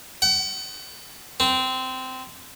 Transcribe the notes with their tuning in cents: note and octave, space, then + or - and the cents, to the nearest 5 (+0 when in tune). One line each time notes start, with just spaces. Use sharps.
F#5 +40
C4 -15